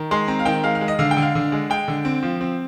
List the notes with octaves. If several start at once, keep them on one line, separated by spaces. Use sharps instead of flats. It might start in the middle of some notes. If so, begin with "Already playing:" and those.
Already playing: D#3
G#3 C6
C4 A#5
F5
D#3 G5
G#3 F5
F5
G#3
D#5
D3 F5
G5
D3
F5
D3
G#3
G#3 G5
D3
C4
F3
C4